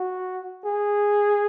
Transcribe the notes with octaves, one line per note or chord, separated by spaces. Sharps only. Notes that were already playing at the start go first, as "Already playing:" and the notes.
Already playing: F#4
G#4